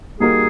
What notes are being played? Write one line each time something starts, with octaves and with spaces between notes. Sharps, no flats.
G3 A#3 D#4 F#4 G#4 A#4